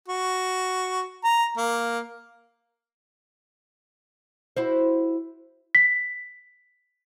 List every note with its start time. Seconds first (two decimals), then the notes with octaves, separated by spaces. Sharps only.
0.08 F#4
1.24 A#5
1.58 A#3
4.57 E4 F#4 C5
5.75 B6